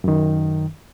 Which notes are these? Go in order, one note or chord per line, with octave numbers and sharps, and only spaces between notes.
F#2 D#3